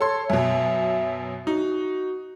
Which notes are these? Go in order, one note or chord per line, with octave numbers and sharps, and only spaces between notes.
A4 C#5 C6
F#2 B2 E5
D#4 F#4